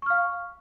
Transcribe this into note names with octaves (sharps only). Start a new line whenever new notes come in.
F5 C#6 F6